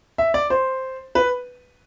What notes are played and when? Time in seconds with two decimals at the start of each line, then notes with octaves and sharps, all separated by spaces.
0.18 E5
0.34 D5
0.50 C5
1.15 B4